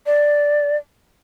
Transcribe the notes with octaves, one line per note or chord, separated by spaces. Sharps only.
D5